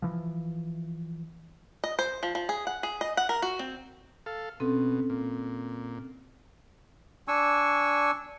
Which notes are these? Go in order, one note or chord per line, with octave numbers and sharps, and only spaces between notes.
E3 F3
D#5
C5
F3
F3
G#4
F#5
G#4
D#5
F#5
A#4
F#4
C4
A4 F5
B2 C4 C#4 A4
A#2
D4 G#5 C#6 E6